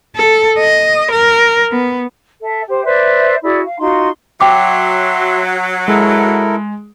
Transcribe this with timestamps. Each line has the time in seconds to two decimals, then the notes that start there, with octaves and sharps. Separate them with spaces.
0.16 A4
0.59 D#5
1.11 A#4
1.72 B3
2.41 A4 E5
2.67 G4 C5
2.84 B4 C5 D5 E5
3.42 E4 F#4 G#4 D5
3.63 F5
3.78 D#4 F4 F#4 C6
4.41 F#3 E5 G5 C6 D6
5.88 G#3 E4 A4 A#4